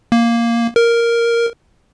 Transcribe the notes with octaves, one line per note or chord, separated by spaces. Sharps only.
A#3
A#4